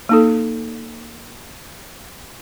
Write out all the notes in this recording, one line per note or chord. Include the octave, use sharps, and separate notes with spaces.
A#3 D#4 A4